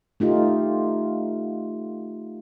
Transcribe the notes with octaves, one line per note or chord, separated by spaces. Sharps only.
A3 D#4 F4 G4